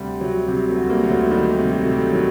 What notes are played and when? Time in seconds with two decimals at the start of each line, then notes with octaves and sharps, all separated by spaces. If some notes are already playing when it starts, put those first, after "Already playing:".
Already playing: D2 C3 G3
0.21 C3 F#3
0.48 C3 G3
0.69 F#3 A3
0.75 D2
0.89 G3 A#3
1.04 D2
1.10 F#3 A3
1.31 D#3 G3
1.51 G3
1.59 C3
1.72 F#3
1.84 C3 A3
1.92 G3
2.13 D#3 F#3